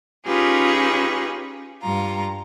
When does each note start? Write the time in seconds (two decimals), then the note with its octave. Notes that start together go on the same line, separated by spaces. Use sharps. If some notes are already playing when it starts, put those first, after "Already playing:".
0.25 C#4 D#4 F4 G4 G#4 B4
1.82 G2 F4 A#5